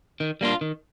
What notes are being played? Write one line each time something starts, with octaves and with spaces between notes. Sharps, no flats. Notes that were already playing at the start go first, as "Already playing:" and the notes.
D#3
G3 A#3 D4 F4
D#3